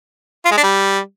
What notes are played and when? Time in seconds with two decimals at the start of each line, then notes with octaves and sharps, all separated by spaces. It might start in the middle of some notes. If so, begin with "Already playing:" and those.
0.45 F4
0.51 G#3
0.57 D4
0.63 G3